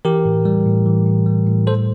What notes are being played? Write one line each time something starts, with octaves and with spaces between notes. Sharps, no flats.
E3 G4 A#4
A2
G3
A2
E3
A2
G3
A2
G3 A4 C5